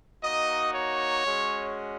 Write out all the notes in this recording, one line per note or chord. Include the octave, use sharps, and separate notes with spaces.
A#3 D#4 F#4 D#5
C#5
G#3 C#4 F#4